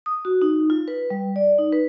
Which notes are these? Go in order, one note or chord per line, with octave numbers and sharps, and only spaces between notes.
D#6
F#4
D#4
F4
B4
G3
D5
D#4
B4